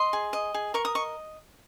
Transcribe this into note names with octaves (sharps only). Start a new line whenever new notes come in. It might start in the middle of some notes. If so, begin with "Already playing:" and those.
Already playing: D#5 C6
G#4
D#5
G#4
A#4 C#6
D#6
D#5 C#6